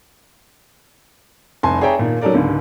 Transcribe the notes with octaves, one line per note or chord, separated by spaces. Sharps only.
F1 C2 G#5 A5 C6
G#4 C#5 D5 E5 G5 A#5
A#2 D#3
F#3 C#4 D#4 A4 A#4 D5
C#2 G#2 D3